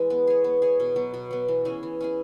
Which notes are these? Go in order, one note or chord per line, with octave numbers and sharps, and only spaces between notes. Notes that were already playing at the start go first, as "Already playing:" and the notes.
Already playing: E3 G#3
B3
G#4 C#5
B3
G#4 C#5
B2
F#3 B3
B2
F#3 B3
E3
C#4 E4 G#4
E3
C#4 E4 G#4